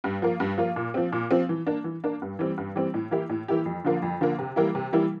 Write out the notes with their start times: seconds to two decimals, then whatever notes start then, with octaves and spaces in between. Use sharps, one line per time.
0.04 G2
0.22 F3 A#3 F4
0.40 G2
0.58 F3 A#3 F4
0.76 A#2
0.94 F3 C4
1.12 A#2
1.31 F3 C4
1.49 E3
1.67 A#3 D4
1.84 E3
2.04 A#3 D4
2.22 G2
2.39 E3 G3 C4
2.58 G2
2.76 E3 G3 C4
2.94 A2
3.11 E3 A#3 E4 G4
3.30 A2
3.48 E3 A#3 E4 G4
3.66 F2
3.84 D3 F3 A#3
4.02 F2
4.21 D3 F3 A#3
4.39 C3
4.56 E3 G3 A#3 E4
4.75 C3
4.93 E3 G3 A#3 E4